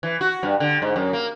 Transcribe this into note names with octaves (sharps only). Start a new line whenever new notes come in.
E3
F#4
G2
D3
G#2
F#2
A#3